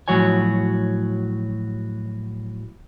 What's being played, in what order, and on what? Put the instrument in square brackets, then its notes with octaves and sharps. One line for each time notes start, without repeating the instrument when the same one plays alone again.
[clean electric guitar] A2 F3 F#3 F#4 C#5 G#5